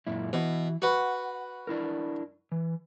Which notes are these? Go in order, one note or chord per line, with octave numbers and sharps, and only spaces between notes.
F#2 A#2 E4
B2 E3
F#4 B4 F#5
D4 E4 A#4
E3